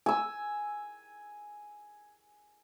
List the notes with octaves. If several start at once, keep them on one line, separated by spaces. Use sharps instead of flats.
G#5 E6